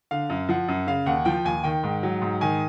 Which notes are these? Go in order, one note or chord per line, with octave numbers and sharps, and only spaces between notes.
D3 F5
F#2
F3 F#5
F#2
C#3 F5
D#2 F#5
F3 G5
D#2 G#5
D#3 G5
G#2
F#3
G#2
D#3 G#5